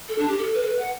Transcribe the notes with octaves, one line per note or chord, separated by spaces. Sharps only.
A4
D4
G4
A4
B4
A4
B4
F#5